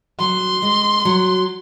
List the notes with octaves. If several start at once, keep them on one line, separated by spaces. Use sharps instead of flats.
F#3 C6
G#3
F#3